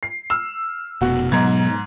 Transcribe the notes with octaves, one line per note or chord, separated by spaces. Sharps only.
C7
E6 F6 E7
F1 B2 F#4
G#2 B2 F#3 B3 A#5 G#6